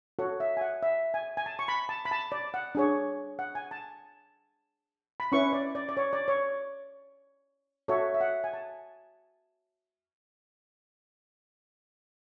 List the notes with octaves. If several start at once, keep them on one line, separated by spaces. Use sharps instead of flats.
F#4 A4 C#5 F#5
E5
G#5
F#5
E5
G#5
G#5
A5
C#6
B5
A5
B5
A5
D5
F#5
D4 G#4 C#5
F#5
G#5
A5
B5
C#4 E4 B4 C#6
D5
D5
D5
C#5
D5
C#5
F#4 A4 C#5 E5
E5
F#5
G#5
A5